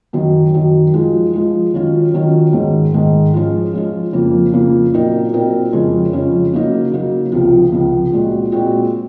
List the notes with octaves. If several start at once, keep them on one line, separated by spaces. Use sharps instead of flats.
F#2 D#3 F#3
F#2 D#3 F#3
F3 G#3 D#4
F3 G#3 D#4
D#3 F#3 C#4 F4
D#3 F#3 C#4 F4
G#2 D#3 G#3
G#2 D#3 G#3
F3 G#3 C#4 F4
F3 G#3 C#4 F4
F2 C#3 F3 A#3
F2 C#3 F3 A#3
A#2 F#3 C4 D#4 A#4
A#2 F#3 C4 D#4 A#4
F2 C#3 F3 G#3 C#4
F2 C#3 F3 G#3 C#4
C#3 F#3 A#3 D#4
C#3 F#3 A#3 D#4
C#2 C3 F3
C#2 C3 F3
A#2 G#3 C4 F#4
A#2 G#3 C4 F#4